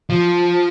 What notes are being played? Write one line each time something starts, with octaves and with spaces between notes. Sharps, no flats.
F3